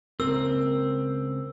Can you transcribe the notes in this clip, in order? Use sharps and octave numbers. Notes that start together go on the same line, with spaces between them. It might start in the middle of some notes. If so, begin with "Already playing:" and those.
C#2 C4 A#4 E6